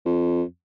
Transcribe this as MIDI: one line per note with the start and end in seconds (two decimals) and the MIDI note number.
0.06 0.43 41